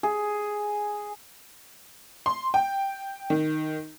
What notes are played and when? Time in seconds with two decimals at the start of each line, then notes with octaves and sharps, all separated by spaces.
0.03 G#4
2.26 C6
2.54 G5
3.30 D#3